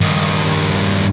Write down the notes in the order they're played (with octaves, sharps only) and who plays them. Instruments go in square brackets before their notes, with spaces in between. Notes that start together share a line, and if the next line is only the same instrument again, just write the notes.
[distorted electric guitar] G2 D#3